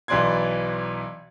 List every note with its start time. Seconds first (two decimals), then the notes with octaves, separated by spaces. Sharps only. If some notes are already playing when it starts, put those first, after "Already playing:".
0.08 B1 E3 B4 D5 C6 G#6